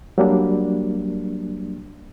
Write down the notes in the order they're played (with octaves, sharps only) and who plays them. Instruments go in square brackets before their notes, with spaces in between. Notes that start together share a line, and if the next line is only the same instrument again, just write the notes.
[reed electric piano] F#3 G3 A#3 D4